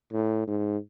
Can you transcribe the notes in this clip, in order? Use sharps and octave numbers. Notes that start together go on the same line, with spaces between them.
A2
G#2